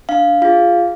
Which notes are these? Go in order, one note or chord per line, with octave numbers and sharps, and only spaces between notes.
D4 F5
F4 G#4 F5